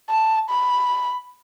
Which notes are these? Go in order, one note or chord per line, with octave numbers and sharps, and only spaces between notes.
A5
B5